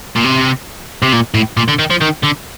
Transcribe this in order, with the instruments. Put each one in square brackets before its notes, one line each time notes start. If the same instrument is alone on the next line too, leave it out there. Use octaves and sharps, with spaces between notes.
[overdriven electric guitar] A#2
C3
C3
A#2
A2
A#2
D3
D#3
F3
D#3
D3